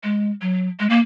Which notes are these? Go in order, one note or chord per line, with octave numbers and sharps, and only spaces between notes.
G#3
F#3
G#3
A#3